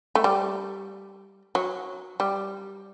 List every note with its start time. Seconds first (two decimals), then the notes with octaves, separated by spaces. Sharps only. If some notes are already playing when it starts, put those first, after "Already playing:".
0.15 A3
0.24 G3
1.55 F#3
2.20 G3